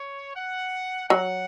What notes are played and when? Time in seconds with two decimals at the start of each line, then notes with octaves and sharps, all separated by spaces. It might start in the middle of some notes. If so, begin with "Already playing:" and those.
Already playing: C#5
0.36 F#5
1.09 F#3 F#5